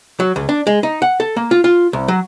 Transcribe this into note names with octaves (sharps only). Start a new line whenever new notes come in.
F#3
C#2
D4
G#3
D#4
F#5
A4
A#3
F4
F4
C2
F#3